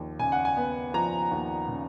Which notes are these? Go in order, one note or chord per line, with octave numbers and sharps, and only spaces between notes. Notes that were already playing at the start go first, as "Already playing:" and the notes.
Already playing: D#2 F3
C#3 G#5
F#5
G#5
B3
F3 A#5
D#2
C#3